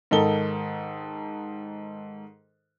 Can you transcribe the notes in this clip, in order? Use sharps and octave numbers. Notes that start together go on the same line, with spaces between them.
G#2 D#3 D#4 A4 A#4 G7